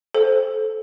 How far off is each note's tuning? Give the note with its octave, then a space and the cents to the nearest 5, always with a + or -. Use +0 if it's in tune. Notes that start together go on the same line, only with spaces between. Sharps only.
A4 -15 C5 +0